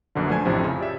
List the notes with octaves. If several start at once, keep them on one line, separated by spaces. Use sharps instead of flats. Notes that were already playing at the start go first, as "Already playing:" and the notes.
A#1 F#2 B2 D3
F3 A3 D4 C5 G#5 G#6
A1 F2 A2 C3 F3
C#3
G4 D5 E5